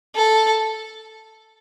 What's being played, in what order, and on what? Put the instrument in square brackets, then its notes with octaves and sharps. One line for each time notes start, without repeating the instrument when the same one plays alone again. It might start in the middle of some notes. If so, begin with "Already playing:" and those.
[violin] A4